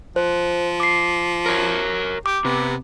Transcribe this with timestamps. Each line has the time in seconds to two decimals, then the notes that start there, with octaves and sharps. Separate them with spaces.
0.16 F3 C5
0.80 D6 C7
1.46 A#4 C#5
2.26 G4 D6
2.45 C3 B3